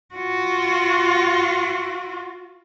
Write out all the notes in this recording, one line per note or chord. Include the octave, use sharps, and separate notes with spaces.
F4 F#4